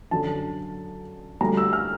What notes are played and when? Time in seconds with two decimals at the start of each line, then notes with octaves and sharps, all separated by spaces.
0.11 F#2 D3 F#3 A5
1.41 D2 D3 G3 A#5
1.57 E6
1.73 F6